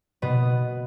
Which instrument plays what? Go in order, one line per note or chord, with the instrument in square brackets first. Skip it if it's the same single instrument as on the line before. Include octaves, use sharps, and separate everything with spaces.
[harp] B2 B3